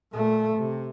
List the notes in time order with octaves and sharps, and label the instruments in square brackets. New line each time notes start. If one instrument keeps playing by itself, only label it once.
[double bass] A#2 A3
C3